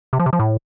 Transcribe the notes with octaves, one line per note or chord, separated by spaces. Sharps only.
C3
F3
C3
F3
A2